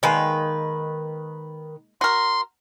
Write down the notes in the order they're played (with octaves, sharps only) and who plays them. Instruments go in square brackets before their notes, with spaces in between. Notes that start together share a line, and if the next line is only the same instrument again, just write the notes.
[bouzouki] D#3 B4 [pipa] G#3 A#3
[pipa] F#4 A#4 [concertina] C6